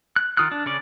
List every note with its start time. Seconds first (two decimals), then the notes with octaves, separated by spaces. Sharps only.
0.16 F#6
0.37 D#3 F4 D#6 F6 F#6
0.52 D4
0.66 C#3 C#4 D5